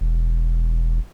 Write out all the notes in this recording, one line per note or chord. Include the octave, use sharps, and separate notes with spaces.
E1